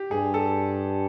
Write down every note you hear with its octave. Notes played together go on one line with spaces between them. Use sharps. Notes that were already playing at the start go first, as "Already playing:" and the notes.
Already playing: G4
G2 G#4
A4